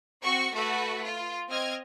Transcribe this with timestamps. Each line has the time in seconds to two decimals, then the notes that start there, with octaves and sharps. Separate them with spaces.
0.23 C4 F#4 C#6
0.52 A3 F#4 A4 B4
1.03 F4
1.49 C4 D#5 F6 G#6